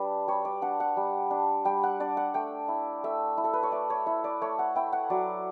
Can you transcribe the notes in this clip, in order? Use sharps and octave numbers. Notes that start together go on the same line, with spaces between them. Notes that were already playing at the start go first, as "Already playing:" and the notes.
Already playing: G3 D4 B4
G3 C#5
D5
D4 F#5
F#5
G3
D4
G3 G5
F#5
D4 D5
F#5
A3 G5
E4
A3 E5
E4
A4
B4
C#5
A3 D5
C#5
E4 E5
D5
A3 C#5
F#5
E4 G5
F#5
F#3 D5